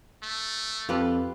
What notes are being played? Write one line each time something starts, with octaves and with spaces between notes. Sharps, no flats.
A3
F2 C4 F4 G4 A4 B4